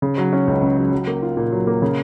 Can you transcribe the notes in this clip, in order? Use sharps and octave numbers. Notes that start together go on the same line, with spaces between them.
C#3
F#3
C#4
C#2
C#3
F#3
F#3
A#3
F4
A#2
F#3
A#3
C#3